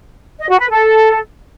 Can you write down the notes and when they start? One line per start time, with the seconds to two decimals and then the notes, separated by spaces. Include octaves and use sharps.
0.39 D#5
0.49 F#4
0.60 B4
0.70 A4